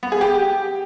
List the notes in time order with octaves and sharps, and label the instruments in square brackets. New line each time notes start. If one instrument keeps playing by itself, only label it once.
[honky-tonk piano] B3
G#4
G4